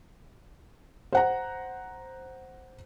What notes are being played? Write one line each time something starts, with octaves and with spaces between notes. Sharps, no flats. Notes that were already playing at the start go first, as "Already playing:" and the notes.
C5 F#5 A#5